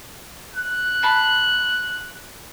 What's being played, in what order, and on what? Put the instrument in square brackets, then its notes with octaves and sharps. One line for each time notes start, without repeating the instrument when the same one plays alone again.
[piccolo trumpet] F#6
[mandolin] A5 B5 C6